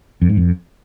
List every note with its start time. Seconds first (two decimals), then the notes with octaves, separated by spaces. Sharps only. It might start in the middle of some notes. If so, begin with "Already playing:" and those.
0.22 F2
0.29 G#2
0.37 F2